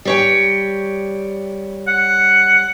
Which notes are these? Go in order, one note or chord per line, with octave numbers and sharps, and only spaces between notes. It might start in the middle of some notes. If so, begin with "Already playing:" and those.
G3 C#5 G5
F#5